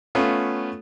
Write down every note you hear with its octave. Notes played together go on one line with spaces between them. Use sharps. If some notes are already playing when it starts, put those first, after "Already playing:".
A3 B3 C#4 F4